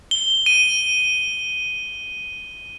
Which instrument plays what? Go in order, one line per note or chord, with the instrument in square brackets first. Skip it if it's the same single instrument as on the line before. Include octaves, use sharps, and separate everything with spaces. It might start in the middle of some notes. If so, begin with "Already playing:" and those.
[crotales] G7
D#7